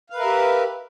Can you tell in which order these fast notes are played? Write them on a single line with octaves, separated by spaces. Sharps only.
F5 B4 A#4 E5 G4